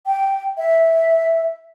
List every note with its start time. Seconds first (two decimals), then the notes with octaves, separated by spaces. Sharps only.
0.06 G5
0.58 E5